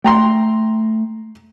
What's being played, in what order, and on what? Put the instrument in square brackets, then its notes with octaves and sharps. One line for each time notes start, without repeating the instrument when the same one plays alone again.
[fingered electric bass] A3 [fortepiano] G5 A#5 C6